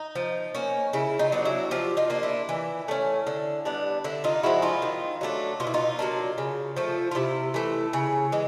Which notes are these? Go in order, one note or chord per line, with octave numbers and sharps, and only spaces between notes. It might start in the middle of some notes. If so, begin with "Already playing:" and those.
Already playing: D#4
F3
A#3 C#4
C#3 E4
D#4 F4
F#3 B3 D4
E4 F#4
F3 F4 G4
D#4 F4
A#3 D4
E4
E3
A3 C#4
D3
G3 B3 D4
D3 E4
D#4 F4
F3 G#3 E4 F#4
D#4 F4
D#3
F#3 A3 D4
B2 F4
E4
D#4 F4
F#3 A#3 D4
C#3
F3 A3
F4
C3 E4
E3 A3
C#3
E3 G#3